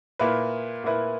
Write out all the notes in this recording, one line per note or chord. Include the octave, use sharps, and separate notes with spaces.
A#2 A#3 E4 B4
A#2 A#3 E4 B4